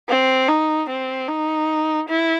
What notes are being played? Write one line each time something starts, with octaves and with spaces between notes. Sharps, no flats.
C4
D#4
C4
D#4
E4